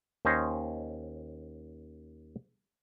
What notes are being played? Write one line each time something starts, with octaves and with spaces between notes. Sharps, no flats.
D#2 C#4 C5 D#5